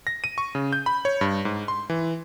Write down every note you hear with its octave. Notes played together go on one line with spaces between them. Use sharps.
A#6
D#7
C#6
C#3
G6
B5
C#5
G2
G#2
C6
E3